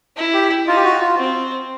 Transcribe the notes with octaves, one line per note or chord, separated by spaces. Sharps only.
E4
G4
D#4 F4
G4
F#4
F4
C4